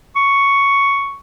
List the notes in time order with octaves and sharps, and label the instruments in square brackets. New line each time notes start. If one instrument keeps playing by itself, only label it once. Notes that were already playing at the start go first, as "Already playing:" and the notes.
[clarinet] C#6